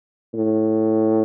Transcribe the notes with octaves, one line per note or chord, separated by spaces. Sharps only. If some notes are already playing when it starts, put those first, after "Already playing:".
A2